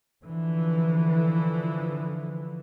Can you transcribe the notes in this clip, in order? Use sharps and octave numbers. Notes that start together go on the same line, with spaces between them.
D3 E3 F3